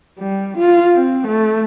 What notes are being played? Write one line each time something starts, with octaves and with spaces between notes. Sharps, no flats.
G3
F4
C4
A3